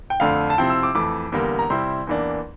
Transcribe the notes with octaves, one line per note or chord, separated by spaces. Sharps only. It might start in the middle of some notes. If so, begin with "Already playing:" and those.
G5
F2 D3 A3 D4 F5
A5
C3 F3 C4 E4 G5
E6
D6
F2 E3 A3 D6
E2 D3 G3 A#3
A#5
C3 G3 C4 E4 C6
E2 E3 A#3 D4